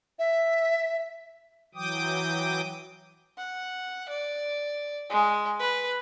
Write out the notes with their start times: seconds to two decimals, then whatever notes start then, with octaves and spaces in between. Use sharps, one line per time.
0.19 E5
1.75 E3 F#3 G5 D6 D#6
3.38 F#5
4.09 D5
5.10 G#3
5.60 B4